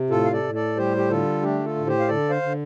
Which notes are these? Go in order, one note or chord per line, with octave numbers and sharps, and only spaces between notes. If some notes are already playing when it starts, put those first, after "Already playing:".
Already playing: C3
A2 F4 A4
F5
A4 D5
A2
A4 D5
G3 G4 C5
G4
D3 F4 A4
A3 D4 G4
F4 A4
A2
G4 C5
F5
D3 A4 D5
C5 F5
D3